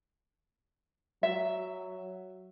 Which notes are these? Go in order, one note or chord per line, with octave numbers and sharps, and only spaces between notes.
F#3 E5